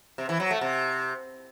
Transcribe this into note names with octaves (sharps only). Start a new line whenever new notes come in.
C3
E3
F#3
A3
C3